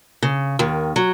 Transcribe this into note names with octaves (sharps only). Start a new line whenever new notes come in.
C#3
D#2 D#3
F#3